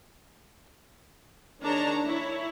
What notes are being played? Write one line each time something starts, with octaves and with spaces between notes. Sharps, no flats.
D#3 D4 G#4 C#5 A5 A#5
E4 C#5